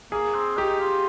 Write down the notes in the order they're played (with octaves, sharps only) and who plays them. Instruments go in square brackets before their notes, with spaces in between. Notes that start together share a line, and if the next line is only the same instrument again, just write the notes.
[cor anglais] A#3 [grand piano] G#4
[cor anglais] C4
[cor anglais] D#4 [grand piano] G4
[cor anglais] F4